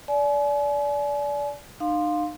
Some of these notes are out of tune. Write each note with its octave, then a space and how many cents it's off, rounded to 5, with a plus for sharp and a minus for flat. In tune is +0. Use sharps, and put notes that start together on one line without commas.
D5 -20 G#5 +40
D#4 -40 F5 +15 C6 +0